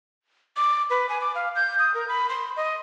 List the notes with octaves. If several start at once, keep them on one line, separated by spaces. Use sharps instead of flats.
D6
B4
G#5
D6
F5
G6
D#6
A#4
B5
C6
D#5